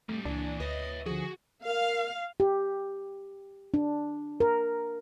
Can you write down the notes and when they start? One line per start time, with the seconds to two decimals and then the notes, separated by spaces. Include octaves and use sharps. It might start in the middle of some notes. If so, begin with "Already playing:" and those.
0.09 F2 G3 A3
0.25 C#2 A#2 E3 D4
0.60 D2 B4 C#5 D#5 E5
1.06 D3 F3 F#4 G#4
1.65 A#4 F5
2.40 G4
3.74 D4
4.40 A#4